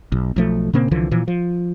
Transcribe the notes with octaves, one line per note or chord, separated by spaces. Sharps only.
B1
B1 F3 A3
A#2 C#3 A#3 C4
C2 D3 E3 F3
A#2 E3 F3
F3